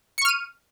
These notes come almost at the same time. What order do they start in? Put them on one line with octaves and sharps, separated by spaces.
C#7 C#6 F6 D#7